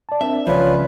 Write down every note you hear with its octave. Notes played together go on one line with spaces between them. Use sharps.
D5 A5
C4 D4 A#4 E5
C2 C#3 F3 F4 B4 C#5 D5